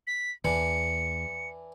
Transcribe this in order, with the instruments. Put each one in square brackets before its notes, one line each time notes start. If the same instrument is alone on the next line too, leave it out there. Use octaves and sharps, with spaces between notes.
[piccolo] B6
[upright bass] E2 [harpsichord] E3 D4 [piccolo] C#7